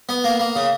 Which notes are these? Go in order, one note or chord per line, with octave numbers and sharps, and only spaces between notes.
B3
A#3
A#3
C#3